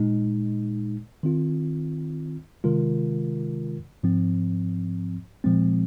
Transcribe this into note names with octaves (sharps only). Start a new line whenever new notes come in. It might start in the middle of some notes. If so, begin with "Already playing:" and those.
Already playing: A#2 G#3 D#4
D#3 C4 F4
C3 D#3 G#3 F4 A#4
G#2 F3 C4
A#2 F3 G#3 C4